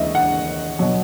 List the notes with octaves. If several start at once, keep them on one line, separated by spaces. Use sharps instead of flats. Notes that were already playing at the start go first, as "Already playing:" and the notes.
Already playing: D#2 C#3 E3 G#3 D#5 E5
F#5
B2 F#3